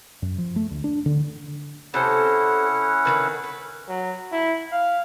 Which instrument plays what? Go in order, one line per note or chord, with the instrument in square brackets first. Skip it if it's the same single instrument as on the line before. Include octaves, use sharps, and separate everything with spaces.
[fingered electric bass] F#2
F3
A3
D2
D4
D3
[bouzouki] C3 A4 C5 [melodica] C#4 E4 F#5
[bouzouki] D#3 F3 B4
B4
[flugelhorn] F#3
E4
F5